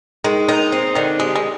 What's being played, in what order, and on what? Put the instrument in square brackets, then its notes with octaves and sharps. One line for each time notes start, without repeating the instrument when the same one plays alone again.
[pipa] D#3 [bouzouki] G#3
[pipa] D#3 [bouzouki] D#4
[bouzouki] C4
[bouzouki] D3 [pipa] D#3
[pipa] G#3 [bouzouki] G4
[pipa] G#3